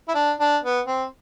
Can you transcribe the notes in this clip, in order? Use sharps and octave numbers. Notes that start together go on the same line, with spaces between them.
E4
D4
D4
B3
C4